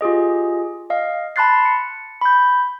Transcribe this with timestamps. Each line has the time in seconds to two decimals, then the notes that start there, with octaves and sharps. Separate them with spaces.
0.01 F4 G4 G#4 D#5
0.90 D#5 F5
1.36 A5 B5 C6 F#6 A6 C7
1.65 C#7
2.21 B5 G6